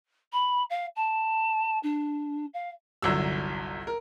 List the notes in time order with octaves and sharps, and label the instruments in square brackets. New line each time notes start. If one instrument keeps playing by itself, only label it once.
[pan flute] B5
F5
A5
D4
F5
[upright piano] G1 C2 F#3 E6
A#4